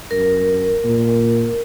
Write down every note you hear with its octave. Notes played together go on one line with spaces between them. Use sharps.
F#2 A#4
A#2